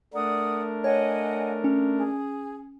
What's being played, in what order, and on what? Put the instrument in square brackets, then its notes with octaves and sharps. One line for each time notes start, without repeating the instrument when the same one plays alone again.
[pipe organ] A3 D4 A#4 [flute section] D5 F#5 D#6
[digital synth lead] C#5 [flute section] D#5 F#5 G#5
[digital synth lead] C#4
[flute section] G#4